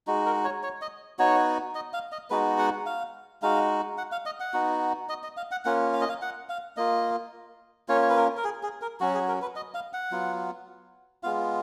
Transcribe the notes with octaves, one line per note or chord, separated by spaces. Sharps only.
G#3 D#4 F#4
A#4
C#5
C#5
D#5
B3 D#4 F#4 C#5
D#5
F5
D#5
G#3 B3 D#4 F#4 B4
F#5
F5
G#3 D#4 F#4 F5
F#5
F5
D#5
F#5
B3 D#4 F#4
D#5
D#5
F5
F#5
A#3 C#4 F4 F#5
F5
D#5
F5
F#5
F5
A#3 F4 D#5
A#3 C#4 F4 C#5
C#5
B4
A#4
A#4
G#4
G#4
A#4
F#3 C#4 F#4
G#4
A#4
B4
D#5
F5
F#5
F#3 B3 F4
G#3 B3 F4 F5